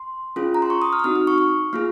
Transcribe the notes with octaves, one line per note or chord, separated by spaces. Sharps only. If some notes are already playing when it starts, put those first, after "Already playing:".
Already playing: C6
C#4 F4 G#4
A#5
C6
C#6
D#6
F6
D#6
C4 D#4 F#4 F6
F6
C#6
C#6
A#3 F4 G#4 F6